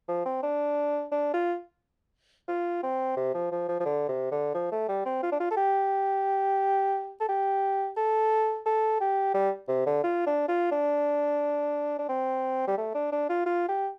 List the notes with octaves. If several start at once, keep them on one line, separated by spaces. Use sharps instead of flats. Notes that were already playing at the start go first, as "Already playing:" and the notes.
F3
C4
D4
D4
F4
F4
C4
C3
F3
F3
F3
F3
D3
C3
D3
F3
A3
G3
C4
F4
D4
F4
A4
G4
A4
G4
A4
A4
G4
G3
C3
D3
F4
D4
F4
D4
D4
C4
G3
A3
D4
D4
F4
F4
G4